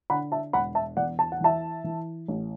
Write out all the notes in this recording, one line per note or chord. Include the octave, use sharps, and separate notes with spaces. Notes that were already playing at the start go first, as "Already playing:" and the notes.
D3 F#5 B5
E5 A5
E1 F#5 B5
E5 A5
E2 D5 F#5
A5
F#5
E3 E5 A5
E3
A1